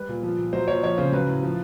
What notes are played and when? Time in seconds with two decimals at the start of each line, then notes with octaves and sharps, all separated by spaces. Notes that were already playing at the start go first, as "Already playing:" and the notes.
Already playing: G3 B4
0.09 A#2
0.23 F3
0.38 A#2
0.53 F#3 C5
0.68 A#2 C#5
0.83 F3 C#5
0.98 C#3 C5
1.12 F#3 B4
1.28 A2
1.43 F3